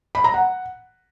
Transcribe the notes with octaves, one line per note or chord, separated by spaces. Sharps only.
B5
A#5
F#5